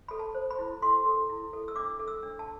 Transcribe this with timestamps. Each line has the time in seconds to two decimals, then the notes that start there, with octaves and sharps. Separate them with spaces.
0.08 A4 B5
0.19 A5
0.34 C5
0.50 B5
0.59 E4
0.82 A4 C6
1.06 A4
1.29 E4
1.53 A4
1.68 E6
1.76 D4 D6
1.99 A4
2.08 E6
2.23 D4
2.39 A5